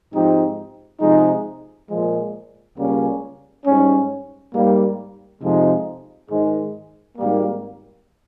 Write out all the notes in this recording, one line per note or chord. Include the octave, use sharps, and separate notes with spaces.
G#2 F3 C4 D#4 G4
C3 F3 G#3 D#4
A#2 F3 G#3
C#2 C#3 G3 A#3 C#4
G#2 G3 C#4
G#2 G3 A#3
F2 C3 F3 G#3 D#4
G#2 D#3 G#3
G#1 G#2 G3 A#3